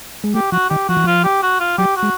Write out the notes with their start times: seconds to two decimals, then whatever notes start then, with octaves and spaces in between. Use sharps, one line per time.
0.24 G#3
0.35 A3 G4
0.52 F3 F#4
0.70 D#3 G4
0.88 F3 F#4
0.97 E3
1.04 F3 F4
1.24 G4
1.43 F#4
1.60 F4
1.78 F#3 G4
1.96 F#4
2.03 G#3